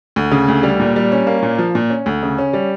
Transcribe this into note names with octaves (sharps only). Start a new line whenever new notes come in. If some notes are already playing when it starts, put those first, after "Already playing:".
D2
C#3
D2
G3
A#2
G3
C#4
A#3
A#2
F3
A#2
C#4
D2
C#3
C#4
G3